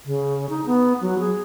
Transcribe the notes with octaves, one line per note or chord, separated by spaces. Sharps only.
C#3
D#4
B3
F#3
G#4